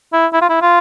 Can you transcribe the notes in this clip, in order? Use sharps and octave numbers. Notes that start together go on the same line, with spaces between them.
E4
E4
F4
E4
F4